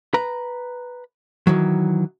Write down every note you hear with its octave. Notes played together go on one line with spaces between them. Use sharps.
B4 A#5
D#3 E3 F#3